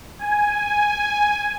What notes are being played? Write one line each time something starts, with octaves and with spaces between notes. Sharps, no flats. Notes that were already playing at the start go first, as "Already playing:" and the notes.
G#5